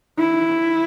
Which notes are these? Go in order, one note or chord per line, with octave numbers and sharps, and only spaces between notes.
E4